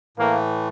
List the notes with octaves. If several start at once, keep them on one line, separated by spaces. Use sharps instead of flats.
A2 E3 A3 A#3